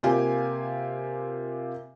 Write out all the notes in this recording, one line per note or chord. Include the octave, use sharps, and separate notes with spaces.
C3 A#3 F4 G4 G#5